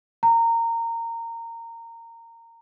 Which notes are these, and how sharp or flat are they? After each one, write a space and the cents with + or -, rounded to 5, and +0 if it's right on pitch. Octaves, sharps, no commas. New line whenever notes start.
A#5 -20